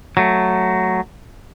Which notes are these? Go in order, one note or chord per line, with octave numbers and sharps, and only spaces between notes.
F#3 A3